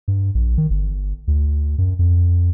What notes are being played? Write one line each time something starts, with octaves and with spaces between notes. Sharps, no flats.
G2
A#1
D#3
G1
D2
F#2
F2